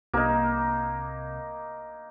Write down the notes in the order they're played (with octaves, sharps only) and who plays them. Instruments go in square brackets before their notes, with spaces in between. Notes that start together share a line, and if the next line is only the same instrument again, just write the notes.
[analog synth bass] C2 [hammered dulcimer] A#3 D#4